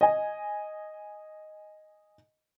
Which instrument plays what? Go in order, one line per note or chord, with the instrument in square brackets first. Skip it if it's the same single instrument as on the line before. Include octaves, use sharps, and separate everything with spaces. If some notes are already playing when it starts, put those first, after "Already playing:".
[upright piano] D#5 G#5